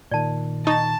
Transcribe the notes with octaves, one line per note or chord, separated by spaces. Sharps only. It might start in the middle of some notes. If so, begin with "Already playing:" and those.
A#2 D#3 D5 A5
D#4 A5 C#6